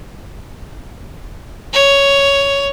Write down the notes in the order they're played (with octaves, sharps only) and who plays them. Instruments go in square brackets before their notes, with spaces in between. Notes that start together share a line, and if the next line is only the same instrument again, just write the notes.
[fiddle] C#5